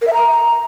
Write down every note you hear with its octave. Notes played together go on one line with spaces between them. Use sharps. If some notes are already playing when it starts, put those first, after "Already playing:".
A#4
E5
A#5